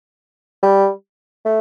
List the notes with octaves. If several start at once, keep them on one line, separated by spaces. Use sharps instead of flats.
G3
A3